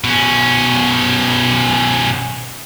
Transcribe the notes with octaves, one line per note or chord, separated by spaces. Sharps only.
B2 C#4